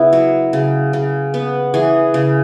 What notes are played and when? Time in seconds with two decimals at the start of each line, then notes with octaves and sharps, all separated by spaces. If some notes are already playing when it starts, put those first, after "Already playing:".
Already playing: C#3 B3 E4
0.13 F#3
0.53 C#3
0.93 C#3
1.34 B3
1.74 E3 G#4
2.14 C#3